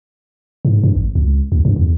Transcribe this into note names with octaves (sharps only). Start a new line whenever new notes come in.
G#2
G2
G#1
C#2
D2
G2
E2